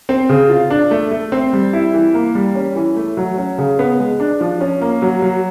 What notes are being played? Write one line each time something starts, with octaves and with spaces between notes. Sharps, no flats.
C4
C#3
F4
D4
A3
A3
C4
G3
E4
E3
A#3
G3
C#4
E3
A3
F#3
C#4
C#3
B3
G#3
D4
F3
C#4
A#3
F#3
F#3